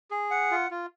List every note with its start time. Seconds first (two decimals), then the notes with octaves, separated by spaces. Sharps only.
0.11 G#4
0.31 F#5
0.51 F4
0.71 F4